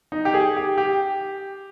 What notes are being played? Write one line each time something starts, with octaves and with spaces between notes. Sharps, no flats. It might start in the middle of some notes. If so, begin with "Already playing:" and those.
D#4
G4
G#4
G4
G4